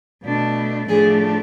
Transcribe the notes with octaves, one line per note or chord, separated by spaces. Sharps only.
B2 A3 D4
A2 F3 A3 D4 G#4